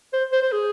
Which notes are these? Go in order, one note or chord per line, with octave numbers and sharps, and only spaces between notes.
C5
C5
C5
G#4